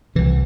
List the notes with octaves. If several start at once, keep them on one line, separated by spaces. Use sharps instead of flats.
C2 C3 E3